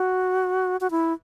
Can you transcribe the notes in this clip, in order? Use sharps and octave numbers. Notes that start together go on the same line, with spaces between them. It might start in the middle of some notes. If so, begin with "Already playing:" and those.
Already playing: F#4
F#4
E4